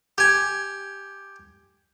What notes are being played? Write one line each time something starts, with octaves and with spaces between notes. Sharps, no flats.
G4 G#5